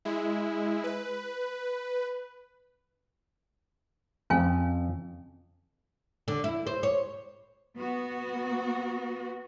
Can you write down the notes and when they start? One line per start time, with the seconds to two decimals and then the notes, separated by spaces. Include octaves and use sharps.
0.05 G#3 E4
0.84 B4
4.30 F2 C#4 F5 G#5
6.28 D3
6.44 E4
6.67 C5
6.83 C#5
7.77 B3 F#4